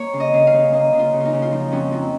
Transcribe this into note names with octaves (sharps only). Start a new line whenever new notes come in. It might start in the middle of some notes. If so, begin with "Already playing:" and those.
Already playing: A#3 C#5
C#3
D#5
C#3
F5
C#3
A#3 D#5
C#3
F4
C#3
D#4 F4
C#3
F4
F3 D#4
F2 C#4
F2 D#4